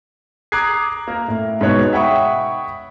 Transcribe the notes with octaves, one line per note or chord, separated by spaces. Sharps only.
A#5 D6 D#6 F#6 G#6 C7
A#3 A#4
A2
G#2 B2 C#5 F#6
E5 F#5 G5 B5 C#6 D#6